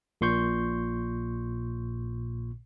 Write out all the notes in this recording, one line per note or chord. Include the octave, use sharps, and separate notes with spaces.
A#1 A#2 C6 C#6 G6